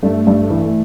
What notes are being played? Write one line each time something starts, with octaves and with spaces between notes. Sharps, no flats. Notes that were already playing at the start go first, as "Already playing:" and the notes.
G2 A3
G2
E3